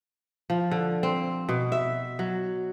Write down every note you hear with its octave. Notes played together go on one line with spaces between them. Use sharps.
F3
D3
C4
B2
E5
F#3